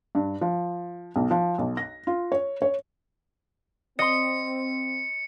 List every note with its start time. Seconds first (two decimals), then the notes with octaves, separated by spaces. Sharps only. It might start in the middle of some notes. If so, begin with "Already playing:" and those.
0.15 G2
0.41 F3
1.16 B1
1.31 F3
1.58 B1
1.77 A#6
2.07 F4
2.32 C#5
2.62 C#5
3.99 C4 D#5 C6 C#7